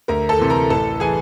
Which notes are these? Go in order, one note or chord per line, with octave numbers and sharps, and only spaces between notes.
D2 A#4 A#5
A4 A5
C3 E3
A#4 A#5
A1 A4 A5
E3 G#4 G#5